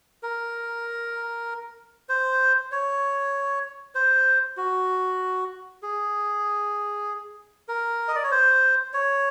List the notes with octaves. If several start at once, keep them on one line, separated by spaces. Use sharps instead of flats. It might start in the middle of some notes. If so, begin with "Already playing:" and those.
A#4
C5
C#5
C5
F#4
G#4
A#4
D#5
D5
C#5
C5
C#5